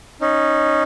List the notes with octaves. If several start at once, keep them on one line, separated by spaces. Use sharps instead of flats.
C#4 D#4